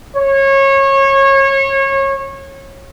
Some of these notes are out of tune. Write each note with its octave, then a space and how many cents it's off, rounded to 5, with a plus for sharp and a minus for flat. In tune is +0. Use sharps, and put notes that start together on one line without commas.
C#5 -25